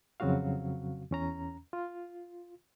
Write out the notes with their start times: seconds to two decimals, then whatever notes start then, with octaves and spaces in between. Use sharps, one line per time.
0.20 F2 C#3 F#3 C4 F#4 F5
1.11 E2 C#4 A#5
1.73 F4